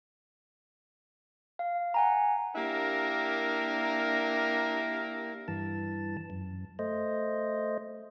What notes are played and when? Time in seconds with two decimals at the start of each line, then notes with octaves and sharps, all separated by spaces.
1.59 F5
1.94 F#5 G#5 A#5
2.55 A#3 D4 E4 G4 A#4
5.48 G2 E3 A5
6.30 F#2
6.79 A3 C5 D#5